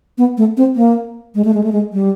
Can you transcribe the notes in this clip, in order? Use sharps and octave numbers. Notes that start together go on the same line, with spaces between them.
B3
A3
C4
A#3
G#3
A3
G#3
A3
G#3
G3